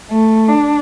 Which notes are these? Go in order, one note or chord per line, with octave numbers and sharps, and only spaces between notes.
A3
D4